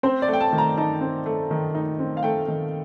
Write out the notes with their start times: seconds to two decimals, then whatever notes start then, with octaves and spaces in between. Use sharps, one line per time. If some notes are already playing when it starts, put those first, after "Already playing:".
0.03 C4 C5
0.22 D5
0.28 A3
0.33 G5
0.41 A5
0.53 D#3
0.58 A#5
0.78 D#4 A5
1.01 C4
1.26 A3
1.51 D#3
1.75 D#4
1.99 C4
2.17 F5
2.23 A3 G5
2.48 D#3